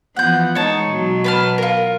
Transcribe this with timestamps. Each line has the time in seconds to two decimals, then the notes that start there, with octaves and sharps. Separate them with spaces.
0.16 E3 F3 B3 F#5 G6
0.55 G#3 D#4 C#5 A5
0.87 B2 F#3
1.24 B4 A5 F6
1.58 F4 A#4